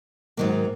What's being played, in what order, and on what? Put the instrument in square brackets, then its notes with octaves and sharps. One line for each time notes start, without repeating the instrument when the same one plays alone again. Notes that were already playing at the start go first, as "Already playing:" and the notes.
[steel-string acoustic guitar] G#2 D#3 F#3 A#3